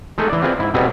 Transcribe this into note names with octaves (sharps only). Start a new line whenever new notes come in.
G#3 A3 D#4 G#4 A4
E3 D5
C4 F4 G#4 B4 D5
G#2 E4
B2 G3 B3 C4 G#4 E5